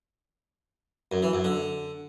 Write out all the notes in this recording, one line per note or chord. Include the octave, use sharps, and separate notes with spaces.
F#2
E3
F#2
D3